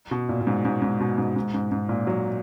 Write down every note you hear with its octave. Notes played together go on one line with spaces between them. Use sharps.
B2
A#2
A#2
G#2
G#2
G#2
B2
G#2
G#2
G#2
G#2
A#2
F#3